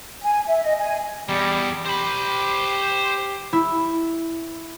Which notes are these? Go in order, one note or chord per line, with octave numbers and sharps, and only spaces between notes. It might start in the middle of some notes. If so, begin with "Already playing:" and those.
G#5
E5
D#5
G#5
E2 G3
G4 C5 B5
E4